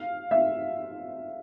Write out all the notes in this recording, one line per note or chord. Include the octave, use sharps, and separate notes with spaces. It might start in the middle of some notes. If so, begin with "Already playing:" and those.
Already playing: F5
E5